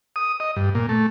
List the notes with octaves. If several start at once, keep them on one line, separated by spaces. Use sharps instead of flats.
D#6
D#5
G2
A#2
A3